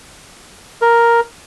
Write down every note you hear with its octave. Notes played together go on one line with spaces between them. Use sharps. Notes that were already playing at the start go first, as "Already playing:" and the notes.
A#4